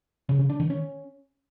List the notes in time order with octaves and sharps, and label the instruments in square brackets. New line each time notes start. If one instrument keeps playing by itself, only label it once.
[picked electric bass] C#3
C#3
D4
D#3
C#4